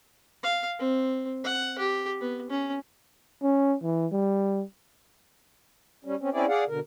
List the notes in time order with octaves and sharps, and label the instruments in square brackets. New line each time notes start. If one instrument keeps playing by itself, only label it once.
[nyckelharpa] F5
C4
F#5
G4
B3
C#4
[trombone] C#4
E3
G3
[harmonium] G3 C#4
C4 C#4
C4 C#4 E4 G#4 D5
G#4 D5 F5 F#5
B2 D3 A#4